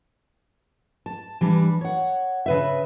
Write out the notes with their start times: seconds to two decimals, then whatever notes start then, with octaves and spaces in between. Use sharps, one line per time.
1.06 A5
1.41 E3 G3 D4
1.81 C#5 F#5
2.46 C#3 B4 E5